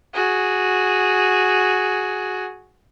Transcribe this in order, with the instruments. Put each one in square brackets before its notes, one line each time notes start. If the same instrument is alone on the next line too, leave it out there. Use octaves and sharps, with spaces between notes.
[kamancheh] F#4 G#4